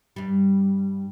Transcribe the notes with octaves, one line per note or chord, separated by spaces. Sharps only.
G2 G3